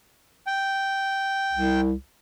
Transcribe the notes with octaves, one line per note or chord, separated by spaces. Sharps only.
G5
C2